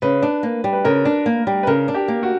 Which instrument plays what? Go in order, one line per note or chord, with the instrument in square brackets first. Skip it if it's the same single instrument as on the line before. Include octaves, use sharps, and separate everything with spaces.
[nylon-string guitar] C#3 [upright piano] B4
[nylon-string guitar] D4
A#3
G3
[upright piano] B4
[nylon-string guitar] C#3 [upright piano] A#4
[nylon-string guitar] D4
A#3
G3
[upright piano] B4
[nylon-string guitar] C#3 [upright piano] A#4
[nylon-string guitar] D4
[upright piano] G4
[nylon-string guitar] A#3
[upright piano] F#4